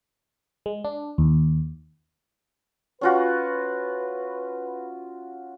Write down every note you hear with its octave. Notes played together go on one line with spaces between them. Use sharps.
G#3
D4
D#2
C#4 F4 F#4 B4